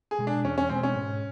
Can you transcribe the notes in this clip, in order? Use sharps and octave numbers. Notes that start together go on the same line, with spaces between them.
G#4
B2 G#3
D4
E2 C#4
C#4
B2 G#3 C4
C#4
G#2